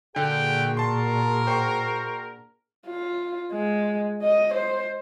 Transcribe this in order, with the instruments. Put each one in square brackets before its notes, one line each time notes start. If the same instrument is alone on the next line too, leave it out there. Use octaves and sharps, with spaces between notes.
[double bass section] A#2 [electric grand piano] D3 [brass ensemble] D4 F#4 G#4 [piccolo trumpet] G5
[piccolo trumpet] A#4 [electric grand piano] A5 C6
[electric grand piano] C5 G5 C#6
[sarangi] F4
G#3
D#5
C5